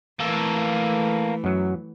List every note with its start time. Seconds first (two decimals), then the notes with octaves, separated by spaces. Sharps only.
0.20 E3 A3 A#3 A4
1.44 F#2 F#3